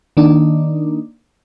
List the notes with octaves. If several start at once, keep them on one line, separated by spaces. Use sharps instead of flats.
D#3 A#3 D4 D#4